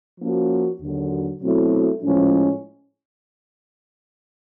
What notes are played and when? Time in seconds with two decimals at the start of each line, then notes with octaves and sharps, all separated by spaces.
0.21 F3 A#3 C#4 F#4
0.82 D#2 D3 F#3
1.42 B2 F#3 A3 C4 E4
2.03 A2 F3 G#3 C#4